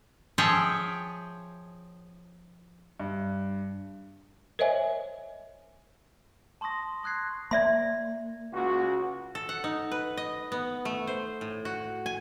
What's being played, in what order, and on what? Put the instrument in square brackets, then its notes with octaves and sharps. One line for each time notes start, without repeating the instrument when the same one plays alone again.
[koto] F3 G#4 C#5 E5 G5
[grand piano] G2
[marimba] A#4 C5 C#5 D#5 E5 G#5
[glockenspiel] A5 C6 C#6 D#6 A#6
C6 D#6 F#6 G#6 C7
[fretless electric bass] A#3 [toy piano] D5 E5 C6
[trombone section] C#2 F#4
[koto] A4
F#5
D#4
B4
D#5
B3
A3
C5
A2
F#4
G#5